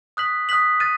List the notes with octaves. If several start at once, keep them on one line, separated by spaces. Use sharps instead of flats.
D#6 F#6 B6 F#7
D#6 F#6 B6 F#7
F#6 A6 D#7